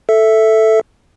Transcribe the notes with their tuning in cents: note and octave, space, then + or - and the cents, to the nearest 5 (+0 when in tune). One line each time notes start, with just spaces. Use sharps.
A4 +0 E5 +0